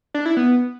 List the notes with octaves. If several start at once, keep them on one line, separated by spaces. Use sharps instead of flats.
D4
E4
B3